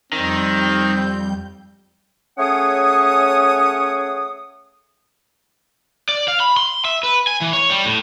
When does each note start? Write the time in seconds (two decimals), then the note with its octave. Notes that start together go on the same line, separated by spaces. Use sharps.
0.12 F2 D#3 G3 C4 G6
2.38 A3 C#4 G#4 C#5 F#5 D#6
6.09 D5
6.28 F5
6.40 B5
6.57 C6
6.85 E5
7.03 B4
7.27 G#5
7.41 E3
7.53 C#5
7.70 G3
7.85 A2